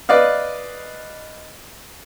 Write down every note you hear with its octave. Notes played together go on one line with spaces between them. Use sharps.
B4 D5 D#5 F5